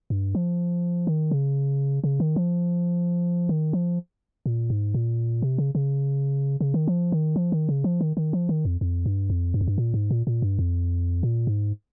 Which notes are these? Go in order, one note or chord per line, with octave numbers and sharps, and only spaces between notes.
G2
F3
D#3
C#3
C#3
D#3
F3
D#3
F3
A#2
G#2
A#2
C3
C#3
C#3
C#3
D#3
F3
D#3
F3
D#3
C#3
F3
D#3
D#3
F3
D#3
F2
F2
G2
F2
G2
F2
G2
A#2
G#2
A#2
A#2
G2
F2
A#2
G#2